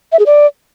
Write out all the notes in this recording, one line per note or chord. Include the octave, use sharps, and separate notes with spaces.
E5
G#4
D5